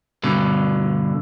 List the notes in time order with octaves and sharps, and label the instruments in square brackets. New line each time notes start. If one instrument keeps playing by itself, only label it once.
[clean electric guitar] G2 B2 D3